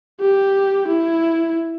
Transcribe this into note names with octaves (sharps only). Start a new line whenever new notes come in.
G4
E4